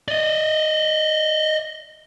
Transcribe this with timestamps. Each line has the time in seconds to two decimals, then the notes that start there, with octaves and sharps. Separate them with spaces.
0.08 D5 D#5